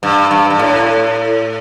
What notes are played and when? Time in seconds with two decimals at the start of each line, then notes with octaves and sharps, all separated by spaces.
0.03 G2
0.31 G2
0.50 G2
0.59 A2